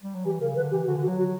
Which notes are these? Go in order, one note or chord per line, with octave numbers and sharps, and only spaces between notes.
G3
F#3
E3 G4
C#3 A#4
D3 B4
E3 G4
G4
D3 F#4
D3
F#4
F#3
F#4